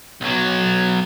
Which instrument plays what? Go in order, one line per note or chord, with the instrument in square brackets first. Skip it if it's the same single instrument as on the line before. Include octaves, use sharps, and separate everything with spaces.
[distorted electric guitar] B1 F#3